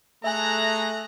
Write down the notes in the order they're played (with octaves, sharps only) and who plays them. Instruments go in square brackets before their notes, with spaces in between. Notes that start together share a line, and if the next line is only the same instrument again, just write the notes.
[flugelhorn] A3 [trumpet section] G#4 A4 A#5 [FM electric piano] E5 G#5 [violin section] F#6 A#6